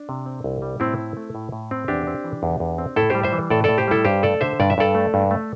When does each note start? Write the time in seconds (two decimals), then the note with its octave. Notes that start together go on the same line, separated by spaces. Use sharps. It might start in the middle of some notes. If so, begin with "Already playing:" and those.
Already playing: D4
0.09 C3
0.26 C4
0.44 C2
0.62 G3
0.80 A2 C4 E4
0.98 C4
1.17 A3
1.35 A2
1.52 A2
1.71 C4
1.88 E2 D4 G4
2.07 C4
2.24 E3
2.43 E2
2.60 E2
2.78 C4
2.96 A2 E4 A4
3.10 G3 G4 C5
3.23 C5 E5
3.33 E3
3.50 A2 A4 D5
3.64 A2 A4 D5
3.78 G4 C5
3.88 G3 E4 A4
4.05 G2 G4 C5
4.23 A3 A4 D5
4.41 D3 C5 E5
4.60 G2 D5
4.70 E5
4.78 G2 A4 D5
4.95 A3
5.14 G2
5.31 A3